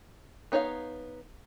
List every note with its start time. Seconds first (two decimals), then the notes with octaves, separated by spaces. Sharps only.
0.52 B3 D#4 C#5 D5 F5